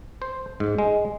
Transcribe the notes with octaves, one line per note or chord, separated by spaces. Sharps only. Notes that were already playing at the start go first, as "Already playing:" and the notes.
C5
G#2
G#3